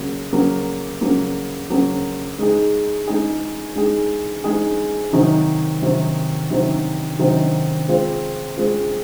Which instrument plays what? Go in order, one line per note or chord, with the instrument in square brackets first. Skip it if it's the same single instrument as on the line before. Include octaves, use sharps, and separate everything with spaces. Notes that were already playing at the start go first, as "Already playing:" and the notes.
Already playing: [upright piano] C#3 F#3 A#3
C#3 F#3 A#3
C#3 F#3 A#3
C#3 F#3 A#3
G#3 D#4 G#4
G#3 D#4 G#4
G#3 D#4 G#4
G#3 D#4 G#4
C3 D#3 F#3 C4 D#4
C3 D#3 F#3 C4 D#4
C3 D#3 F#3 C4 D#4
C3 D#3 F#3 C4 D#4
G#3 C4 F4
G#3 C4 F4